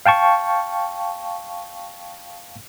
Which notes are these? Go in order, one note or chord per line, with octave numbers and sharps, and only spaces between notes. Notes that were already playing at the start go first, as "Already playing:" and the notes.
F5 G5 A5 C#6